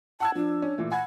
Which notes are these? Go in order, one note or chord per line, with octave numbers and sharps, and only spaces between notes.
F#5 A5 E6 G#6
F3 D4
C#4
A#2 E3 A3
F#5 G#5 B5 G#6